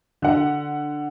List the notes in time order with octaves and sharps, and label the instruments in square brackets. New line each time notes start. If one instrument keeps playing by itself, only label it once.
[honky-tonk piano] D3 F#5